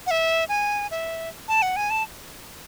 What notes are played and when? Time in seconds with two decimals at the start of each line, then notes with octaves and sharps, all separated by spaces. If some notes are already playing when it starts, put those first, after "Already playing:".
0.06 F#5
0.11 E5
0.49 G#5
0.91 E5
1.48 A5
1.62 F#5
1.76 G#5
1.90 A5